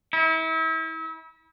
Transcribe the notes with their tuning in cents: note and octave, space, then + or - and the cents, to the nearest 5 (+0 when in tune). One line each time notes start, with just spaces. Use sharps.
E4 -35